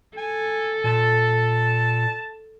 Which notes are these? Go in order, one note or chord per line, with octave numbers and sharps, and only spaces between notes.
A4 G#5
A#2 A5